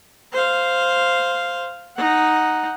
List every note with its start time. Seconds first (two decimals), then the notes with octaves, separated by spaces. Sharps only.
0.32 C5 F5
1.97 D#4 F#5